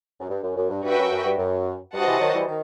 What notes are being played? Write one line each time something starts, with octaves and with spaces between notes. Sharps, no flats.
F#2
G2
F#2
F#2
G2
G2 F#4 B4 E5 G5
F#2
F#2
G2
F#2
G2 F#4 C5 D#5 F#5 A5
C3 E3
D#3 F#3
E3 G3
D#3